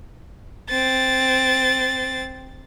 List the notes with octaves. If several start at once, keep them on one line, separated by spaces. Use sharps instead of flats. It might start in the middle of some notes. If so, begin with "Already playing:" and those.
C4 A6